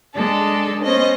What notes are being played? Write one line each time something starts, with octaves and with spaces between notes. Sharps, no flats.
G#3 D4 A4
B3 C#4 C5 D#5